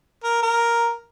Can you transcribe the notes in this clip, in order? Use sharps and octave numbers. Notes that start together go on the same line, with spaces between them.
A#4
A#4